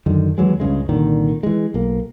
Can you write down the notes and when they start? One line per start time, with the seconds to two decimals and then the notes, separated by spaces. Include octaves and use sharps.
0.06 F#2 D3 D#3
0.38 D#2 E3 F#3 G#3
0.60 C#2 G2 C#3 G#3
0.89 C2 A#2 D3 D#3
1.43 E3 G#3
1.74 B1 A#3